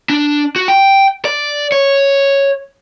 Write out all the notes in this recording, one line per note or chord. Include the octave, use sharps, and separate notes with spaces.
D4
F#4
G5
D5
C#5